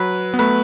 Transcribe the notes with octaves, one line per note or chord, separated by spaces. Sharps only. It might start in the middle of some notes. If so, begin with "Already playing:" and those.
Already playing: F#3 B4
B3
A3 B4